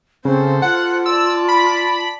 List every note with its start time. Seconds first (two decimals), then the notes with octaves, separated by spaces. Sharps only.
0.25 C#3 C4 A4 C5
0.62 F4 F#5
1.06 D5 A5 E6
1.48 B5